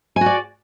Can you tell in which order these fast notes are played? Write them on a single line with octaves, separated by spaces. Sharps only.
G#5 F#4 D5